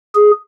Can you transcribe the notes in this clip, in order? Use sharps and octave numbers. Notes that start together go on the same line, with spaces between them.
G#4